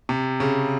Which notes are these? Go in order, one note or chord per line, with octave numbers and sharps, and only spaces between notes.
C3
C#3